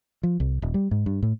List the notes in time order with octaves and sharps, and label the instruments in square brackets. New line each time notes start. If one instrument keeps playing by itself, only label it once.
[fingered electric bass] F3
C2
D#1
G3
G#2
G2
A2